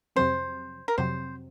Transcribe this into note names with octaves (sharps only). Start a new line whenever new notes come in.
F2 C3 F#3 C4 C5
A#4
F2 C3 F#3 C4 C5